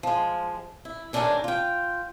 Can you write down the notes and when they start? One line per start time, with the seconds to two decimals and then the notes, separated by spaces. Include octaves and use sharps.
0.03 F3 G#3
0.85 E4
1.13 D#3 E3 G#3 C#4 D4 A#4
1.44 F4 G5